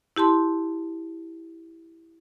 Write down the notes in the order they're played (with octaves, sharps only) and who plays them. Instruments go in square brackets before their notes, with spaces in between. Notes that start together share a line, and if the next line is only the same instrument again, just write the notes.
[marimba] E4 G4 A5 C6